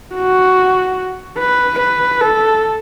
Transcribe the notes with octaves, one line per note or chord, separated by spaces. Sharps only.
F#4
B4
B4
A4